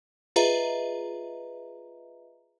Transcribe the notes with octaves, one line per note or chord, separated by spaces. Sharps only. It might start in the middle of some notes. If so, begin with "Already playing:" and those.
F4 G#4 B4 D#5 E5 A#5